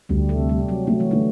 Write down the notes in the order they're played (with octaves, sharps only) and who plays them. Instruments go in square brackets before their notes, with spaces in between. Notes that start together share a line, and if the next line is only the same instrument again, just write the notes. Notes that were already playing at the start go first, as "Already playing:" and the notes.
[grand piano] D2 [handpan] G3
[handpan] A3
[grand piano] C3
[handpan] G3
[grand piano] C3
[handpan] F#3
[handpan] F#3 [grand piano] A3
[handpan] E3
[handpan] D3 [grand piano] A3